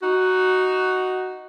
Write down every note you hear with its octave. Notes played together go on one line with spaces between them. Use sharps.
D#4 F#4